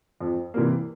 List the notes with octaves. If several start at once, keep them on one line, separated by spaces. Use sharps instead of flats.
F2
C3 E3 G3 A#3